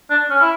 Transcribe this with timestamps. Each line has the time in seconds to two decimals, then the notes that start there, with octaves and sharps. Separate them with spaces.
0.10 D4
0.30 C#4
0.41 E4